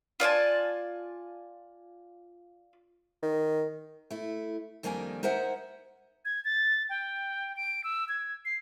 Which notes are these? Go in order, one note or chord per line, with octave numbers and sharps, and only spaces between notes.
F4 D5 G#5 A5
D#3
A3 E4
F2 D#3 G3 A#3 D4 G#5
D#4 A#4 C5 E5 F#5 G#5
G#6
A6
G5
D7
E6
G#6
C7